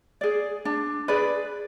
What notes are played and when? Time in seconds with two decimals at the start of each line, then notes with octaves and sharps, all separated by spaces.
0.21 G#4 D5
0.65 D4
1.08 G#4 B4 D5